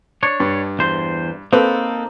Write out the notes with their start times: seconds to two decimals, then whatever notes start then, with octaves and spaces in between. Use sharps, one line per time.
0.23 D4 C#5
0.40 G2
0.79 E2 C5
1.53 A#3 C4 D#4 A4 B4